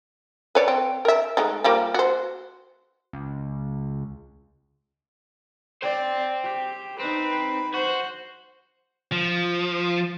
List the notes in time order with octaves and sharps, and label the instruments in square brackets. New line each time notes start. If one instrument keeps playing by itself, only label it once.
[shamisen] B4 C#5 D5
C4
A#4 E5
G#3 A3 D#4
F3 G3 A#3
F#4 C5
[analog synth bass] C#2
[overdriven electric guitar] C5 G5 [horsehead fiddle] D5
[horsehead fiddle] G4
[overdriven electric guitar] C4 [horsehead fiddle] D#4 B4
[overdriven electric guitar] F#4 [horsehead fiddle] C5
[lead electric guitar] F3